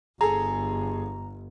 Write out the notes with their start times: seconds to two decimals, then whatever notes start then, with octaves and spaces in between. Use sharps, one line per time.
0.21 G1 G#4 A4 A#5